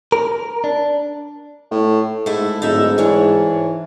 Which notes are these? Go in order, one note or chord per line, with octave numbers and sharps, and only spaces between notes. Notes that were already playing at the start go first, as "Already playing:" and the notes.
A#4
D4
A2
G#2 A3 E4
D1 G#2 D#4 A4 E5
E3 C#4 D4 C#5